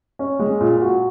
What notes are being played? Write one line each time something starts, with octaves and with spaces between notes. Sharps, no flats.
C#4
G#3
A#2
F#4